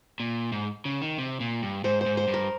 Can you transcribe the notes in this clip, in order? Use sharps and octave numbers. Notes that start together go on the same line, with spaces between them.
A#2
G#2
C#3
D#3
C3
A#2
G2
G#2 C5
C5
G#2
C5
G2
A#4